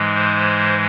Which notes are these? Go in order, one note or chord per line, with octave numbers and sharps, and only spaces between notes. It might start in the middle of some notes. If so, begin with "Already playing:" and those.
Already playing: G#2 E3 G#3
C5